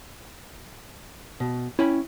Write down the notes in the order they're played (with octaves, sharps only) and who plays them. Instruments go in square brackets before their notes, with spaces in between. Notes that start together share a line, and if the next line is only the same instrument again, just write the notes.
[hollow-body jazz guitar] B2
[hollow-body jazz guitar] C#4 G5 B5 [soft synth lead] E4